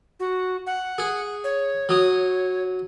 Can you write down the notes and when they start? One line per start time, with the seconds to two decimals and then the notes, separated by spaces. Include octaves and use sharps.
0.20 F#4
0.67 F#5
0.98 G#4
1.44 C#5
1.89 F#3 D#6